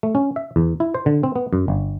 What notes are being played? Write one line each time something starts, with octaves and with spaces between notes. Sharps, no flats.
A3
C#4
E5
E2
E4
C5
D3
C4
B3
F#2
G1